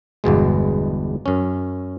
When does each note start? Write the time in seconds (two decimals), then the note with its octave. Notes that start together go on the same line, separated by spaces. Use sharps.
0.24 G1 E2 B2 G#3
1.26 F#2 C#4